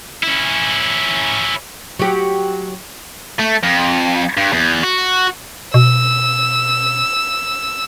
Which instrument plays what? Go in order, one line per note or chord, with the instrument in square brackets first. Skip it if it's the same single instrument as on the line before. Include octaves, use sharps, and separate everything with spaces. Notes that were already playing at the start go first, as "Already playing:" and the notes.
[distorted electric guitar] C#4 E4
[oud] F#3 G4
[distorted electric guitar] A3
F2
G2
E2
F#4
[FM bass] B2 [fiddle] E6